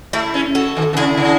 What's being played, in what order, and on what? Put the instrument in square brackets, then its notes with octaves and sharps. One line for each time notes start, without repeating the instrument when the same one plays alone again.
[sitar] A3 [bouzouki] E4 G#4
[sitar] C#4
[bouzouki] F#4 A4
[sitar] D#3
C3
[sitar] C#3 [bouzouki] E4 G#4
[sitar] C#3